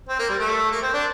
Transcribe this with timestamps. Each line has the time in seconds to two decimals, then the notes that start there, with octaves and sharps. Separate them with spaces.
0.09 C4
0.19 A#3
0.30 G3
0.40 A3
0.72 A#3
0.82 C4
0.94 D4